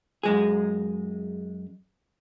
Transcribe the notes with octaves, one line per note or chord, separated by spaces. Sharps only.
F#2 G#3 G#4